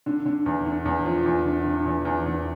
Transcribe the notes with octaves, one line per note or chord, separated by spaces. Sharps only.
D3
D3
E2
D3
E2
F3
E2
D3
D3
E2
E2
E2